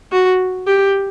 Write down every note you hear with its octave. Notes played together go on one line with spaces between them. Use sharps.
F#4
G4